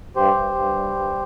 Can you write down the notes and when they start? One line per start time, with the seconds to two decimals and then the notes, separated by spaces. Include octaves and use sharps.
0.16 G2 G4 C5
0.36 G2
0.55 G2
0.75 G3
0.95 G2